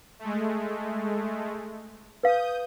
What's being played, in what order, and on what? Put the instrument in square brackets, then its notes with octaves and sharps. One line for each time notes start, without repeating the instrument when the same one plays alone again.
[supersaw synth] G#3 A3
[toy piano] B4 F5 [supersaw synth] D#6 G6